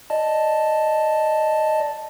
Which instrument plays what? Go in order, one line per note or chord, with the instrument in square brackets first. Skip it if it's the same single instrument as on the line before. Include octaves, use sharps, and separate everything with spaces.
[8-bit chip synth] D5 D#5 A5